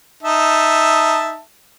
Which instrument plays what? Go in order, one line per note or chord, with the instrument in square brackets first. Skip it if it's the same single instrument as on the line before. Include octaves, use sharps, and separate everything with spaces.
[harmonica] D#4 E5 A5